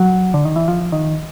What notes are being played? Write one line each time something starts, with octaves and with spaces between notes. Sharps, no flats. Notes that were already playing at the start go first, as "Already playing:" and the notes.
Already playing: F#3
D3
D#3
E3
F3
D#3